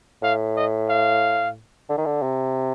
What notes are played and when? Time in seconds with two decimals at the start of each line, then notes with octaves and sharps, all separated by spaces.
0.22 A2 F5
0.56 D#5
0.89 F5
1.89 D3
1.98 D#3
2.06 D3
2.23 C3